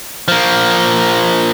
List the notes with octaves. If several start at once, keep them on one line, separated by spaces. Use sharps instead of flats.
F3 A#3